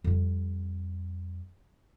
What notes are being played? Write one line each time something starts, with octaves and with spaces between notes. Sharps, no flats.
F2 G3